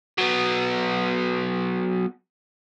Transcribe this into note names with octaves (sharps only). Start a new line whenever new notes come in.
F#3 B3